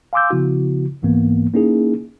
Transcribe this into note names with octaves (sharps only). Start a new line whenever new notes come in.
F5 G#5 C6 D6 E6 G6
C#3 F3 B3 E4 F#4
C2 G#2 E3 A#3 B3
A#3 C#4 D#4 E4 G#4